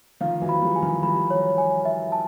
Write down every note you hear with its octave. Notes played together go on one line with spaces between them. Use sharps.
D#3 F3 F5
E3 F#3
B5
F3 G3
G#5
D#3 F3
F3 G3 B5
C#5
G#5
E5
A5